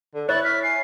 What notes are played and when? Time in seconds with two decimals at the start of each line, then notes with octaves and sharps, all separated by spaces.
0.15 D3 A4
0.29 E4 C#5 F#6 A6
0.44 F6 B6
0.63 G#5 C7